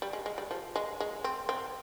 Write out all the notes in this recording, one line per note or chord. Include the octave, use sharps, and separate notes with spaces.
G3
G#3
G#3
G3
F3
G#3
G#3
C4
C4